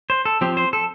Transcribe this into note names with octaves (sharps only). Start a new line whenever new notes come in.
C5
A4
F3 C4 G4
C5
A4